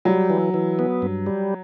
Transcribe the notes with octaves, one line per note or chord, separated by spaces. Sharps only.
F#3 G3
E3
E3
B3
G2
G3